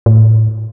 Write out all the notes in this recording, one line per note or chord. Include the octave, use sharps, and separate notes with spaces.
A2